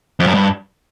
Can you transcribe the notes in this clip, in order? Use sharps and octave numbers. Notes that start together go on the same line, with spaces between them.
F2
F#2
G2